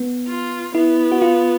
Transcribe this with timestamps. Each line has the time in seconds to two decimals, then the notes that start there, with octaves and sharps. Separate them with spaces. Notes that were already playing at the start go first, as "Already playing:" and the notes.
Already playing: B3
0.27 F4
0.75 B3 E4
1.12 F#4
1.22 F4